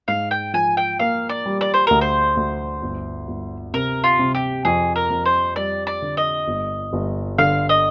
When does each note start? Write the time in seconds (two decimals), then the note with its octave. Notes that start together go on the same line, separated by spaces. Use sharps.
0.08 G#2 F5
0.31 G5
0.54 F3 G#5
0.77 G5
0.99 A#3 F5
1.29 D5
1.46 G3
1.61 D5
1.74 C5
1.87 D2 A#4
2.01 C5
2.37 D2
2.82 G1
3.28 G1
3.73 C3 A#4
4.04 F4
4.19 C3
4.35 G4
4.65 F2 G#4
4.96 A#4
5.10 F2
5.26 C5
5.56 G3 D5
5.87 D5
6.02 D3
6.17 D#5
6.48 G1
6.93 G1
7.38 D3 F5
7.69 D#5